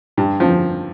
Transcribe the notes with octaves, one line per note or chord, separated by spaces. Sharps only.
G2
F3